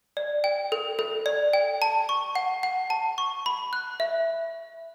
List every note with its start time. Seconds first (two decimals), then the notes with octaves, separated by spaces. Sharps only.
0.17 D5
0.44 G5
0.72 A4
0.99 A4
1.26 D5
1.53 G5
1.82 A5
2.09 C#6
2.35 F#5
2.63 F#5
2.90 A5
3.18 C#6
3.46 B5
3.73 F#6
4.00 E5